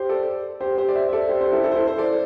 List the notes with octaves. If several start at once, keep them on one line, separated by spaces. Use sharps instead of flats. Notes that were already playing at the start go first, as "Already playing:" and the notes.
Already playing: G4 C5
A4 D5
G4 C5
G4 C5
D5
C5 E5
E5
A4 D5
G4 C5
G4 C5
E4 A4
G4
E4 A4
C5
E4 A4
C5
A4 D5